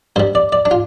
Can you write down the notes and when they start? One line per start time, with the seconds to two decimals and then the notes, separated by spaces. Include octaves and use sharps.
0.16 G2 G3 C5
0.35 D5
0.53 D5
0.65 D4
0.71 F4